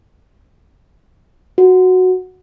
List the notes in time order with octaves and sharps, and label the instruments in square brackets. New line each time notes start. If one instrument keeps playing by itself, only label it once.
[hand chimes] F#4